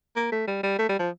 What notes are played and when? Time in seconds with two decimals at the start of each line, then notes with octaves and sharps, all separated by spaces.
0.16 A#3
0.32 A3
0.47 G3
0.63 G3
0.79 A3
0.89 G3
0.99 F3